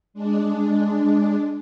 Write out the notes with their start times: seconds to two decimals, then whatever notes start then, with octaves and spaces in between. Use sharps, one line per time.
0.14 G#3 D4